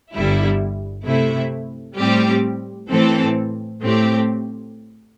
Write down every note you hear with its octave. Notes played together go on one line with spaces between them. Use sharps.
G1 G2 D3 G3 E4
C3 A3 E4
A2 G3 C4 G4
A2 E3 C4 A4
A2 A3 C4 G4